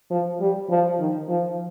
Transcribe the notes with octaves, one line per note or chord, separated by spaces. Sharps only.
F3
G3
F3
D#3
F3